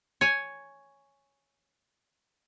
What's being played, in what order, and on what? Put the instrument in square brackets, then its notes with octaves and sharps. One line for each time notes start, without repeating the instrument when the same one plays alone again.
[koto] C#5 G#5